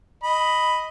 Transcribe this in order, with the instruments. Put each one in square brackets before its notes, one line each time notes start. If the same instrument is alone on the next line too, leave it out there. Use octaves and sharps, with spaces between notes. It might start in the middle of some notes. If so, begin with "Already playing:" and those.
[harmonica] D#5 B5